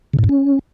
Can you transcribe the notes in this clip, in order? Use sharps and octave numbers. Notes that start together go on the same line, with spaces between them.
C#3
A2
G#2
C#4